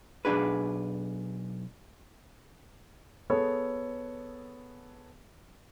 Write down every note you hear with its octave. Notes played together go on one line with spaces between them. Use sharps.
B1 D4 G#4 B4
B3 G#4 A4 C#5